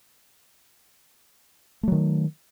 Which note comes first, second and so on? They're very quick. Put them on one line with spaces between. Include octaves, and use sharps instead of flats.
A3 F#3 D#3